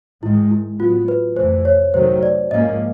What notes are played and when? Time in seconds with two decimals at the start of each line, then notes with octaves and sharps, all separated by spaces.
0.22 G#2 D#3 G#3 E4
0.51 E4
0.79 A2 F#3 B3 F4
1.08 B4
1.36 F2 C3 E3 A3 C5
1.65 C#5
1.94 C3 D#3 F#3 A3 C5
2.23 D5
2.51 G#2 F3 A#3 C#4 D#5